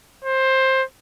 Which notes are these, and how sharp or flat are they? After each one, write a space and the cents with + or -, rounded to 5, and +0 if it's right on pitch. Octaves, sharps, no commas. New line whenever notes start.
C5 +15